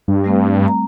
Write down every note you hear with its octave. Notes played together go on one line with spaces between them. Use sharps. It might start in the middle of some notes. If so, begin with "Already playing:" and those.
G2
G3 A3 C4
A#5